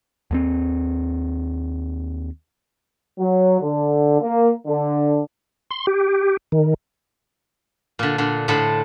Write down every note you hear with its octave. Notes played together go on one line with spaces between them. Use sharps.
D#2 G#3 C4
F#3
D3
A#3
D3
C6
G4
D#3
A#2 D3
A#2 D3
A2 D3 A4 C5 B5